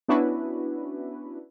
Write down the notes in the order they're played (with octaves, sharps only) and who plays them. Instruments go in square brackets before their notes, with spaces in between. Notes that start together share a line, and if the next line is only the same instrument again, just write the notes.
[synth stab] B3 C#4 D4 E4 F#4 B4